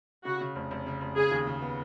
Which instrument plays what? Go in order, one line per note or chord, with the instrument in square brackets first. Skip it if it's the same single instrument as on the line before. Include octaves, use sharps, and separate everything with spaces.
[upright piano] C#3 [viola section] F#4
[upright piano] C#3
F1
F1
C#3
F1
[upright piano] C#3 [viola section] G#4
[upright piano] D#2
C#3
B3